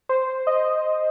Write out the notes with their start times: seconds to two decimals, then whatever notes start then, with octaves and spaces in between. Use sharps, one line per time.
0.09 C5
0.47 D#5